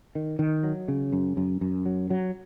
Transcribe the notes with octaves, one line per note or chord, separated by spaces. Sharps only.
D#3
D#3
F#3
C#3
F#2
F#2
F#2
F#3
F#3